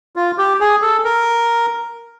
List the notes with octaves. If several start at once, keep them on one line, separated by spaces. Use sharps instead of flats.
F4
G4
G#4
A4
A#4